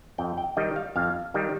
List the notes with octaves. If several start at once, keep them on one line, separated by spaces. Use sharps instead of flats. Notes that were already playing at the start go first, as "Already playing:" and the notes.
F2 G5
G5
D#3 G3 D#5
F5
F2 F5
D#3 G3